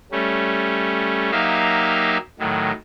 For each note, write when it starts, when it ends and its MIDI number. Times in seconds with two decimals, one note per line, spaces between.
0.12 1.31 55
0.12 1.31 57
0.12 1.31 61
1.32 2.18 54
1.32 2.18 58
1.32 2.18 63
1.32 2.18 67
1.32 2.18 76
1.32 2.18 77
2.39 2.72 45
2.39 2.72 51
2.39 2.72 54